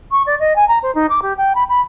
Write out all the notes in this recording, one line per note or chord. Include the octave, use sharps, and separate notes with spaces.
C#6
D5
D#5
G#5
A#5
C5
D#4
D6
G4
G5
B5
B5